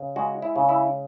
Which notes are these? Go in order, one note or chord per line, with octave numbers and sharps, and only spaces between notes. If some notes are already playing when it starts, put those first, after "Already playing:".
Already playing: C#3
G#3 F#4
E4
C#3
E4